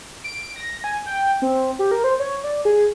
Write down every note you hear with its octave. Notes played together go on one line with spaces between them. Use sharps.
D7
A#6
G#5
G5
C4
G4
A#4
C5
C#5
D5
G#4